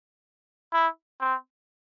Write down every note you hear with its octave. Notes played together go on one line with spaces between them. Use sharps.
E4
C4